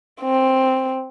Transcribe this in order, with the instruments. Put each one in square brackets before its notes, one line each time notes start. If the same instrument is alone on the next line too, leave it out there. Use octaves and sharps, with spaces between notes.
[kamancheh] C4